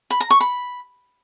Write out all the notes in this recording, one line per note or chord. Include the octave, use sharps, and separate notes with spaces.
B5
A#5
C#6
B5